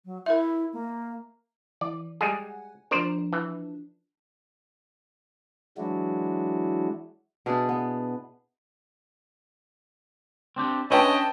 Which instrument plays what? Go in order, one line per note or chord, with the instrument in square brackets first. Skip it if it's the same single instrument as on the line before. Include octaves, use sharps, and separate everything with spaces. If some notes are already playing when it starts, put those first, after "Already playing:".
[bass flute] F#3
[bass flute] E4 [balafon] A#4 E5
[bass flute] A#3
[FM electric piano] E3 [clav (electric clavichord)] D5
[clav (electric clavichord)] G3 G#3 G#4 [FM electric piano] F#5 G#5
[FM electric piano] F3 D4 [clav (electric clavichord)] A#4 C5 D5
[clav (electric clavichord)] E3
[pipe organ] E3 F#3 G#3 D4 E4 F#4
[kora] B2 D4 E4 G#4
B3
[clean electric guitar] C4 D4 G4
[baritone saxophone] C#4 [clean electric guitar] D4 E5 [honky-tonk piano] B4 G5 A5 [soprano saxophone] D#5